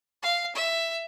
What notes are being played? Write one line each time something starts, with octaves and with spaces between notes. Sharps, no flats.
F5
E5